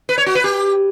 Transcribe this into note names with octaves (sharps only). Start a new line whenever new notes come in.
B4
C#5
F#4
B4
G4